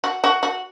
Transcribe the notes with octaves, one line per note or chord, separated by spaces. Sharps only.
F#4
F#4
F#4